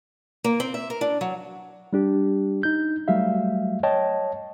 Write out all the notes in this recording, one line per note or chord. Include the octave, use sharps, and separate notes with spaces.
A#3
C4
E5
A#4
D4
F#3
G3 D4 G4
D#4 G6
F#3 G3 A3 F#4 E5 F5
C#5 D#5 G5 A5